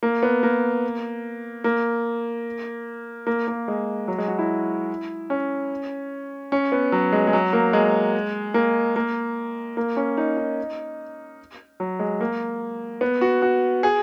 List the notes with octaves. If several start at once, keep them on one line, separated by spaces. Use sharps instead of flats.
A#3
B3
A#3
A#3
A#3
A#3
G#3
F#3
G#3
F#4
E4
C#4
C#4
B3
F#3
G#3
G#3
F#3
A#3
G#3
A#3
A#3
A#3
C#4
D#4
D#4
F#3
G#3
A#3
B3
F#4
F#4
G#4